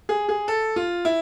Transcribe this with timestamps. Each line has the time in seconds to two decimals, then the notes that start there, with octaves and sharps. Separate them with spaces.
0.09 G#4
0.29 G#4
0.48 A4
0.76 F4
1.05 E4